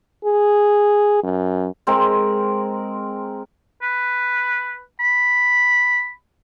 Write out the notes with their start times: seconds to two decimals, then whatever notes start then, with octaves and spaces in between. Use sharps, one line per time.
0.25 G#4
1.23 F#2
1.87 G#3 C4 A#4
3.82 B4
5.00 B5